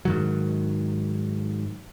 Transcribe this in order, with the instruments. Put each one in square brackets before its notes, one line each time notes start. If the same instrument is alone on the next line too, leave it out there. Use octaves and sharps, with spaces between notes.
[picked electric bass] G#2 D#3 F#3